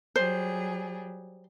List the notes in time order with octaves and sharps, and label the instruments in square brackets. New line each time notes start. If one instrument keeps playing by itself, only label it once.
[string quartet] F#3 G3 G#4 [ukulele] C5